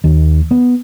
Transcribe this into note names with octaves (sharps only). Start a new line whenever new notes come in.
D#2
B3